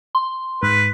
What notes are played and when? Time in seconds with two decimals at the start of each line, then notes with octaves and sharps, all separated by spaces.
0.15 C6
0.63 G#2 B4